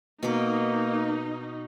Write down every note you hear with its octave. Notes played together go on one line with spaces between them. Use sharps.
B2 A#3 D#4 D6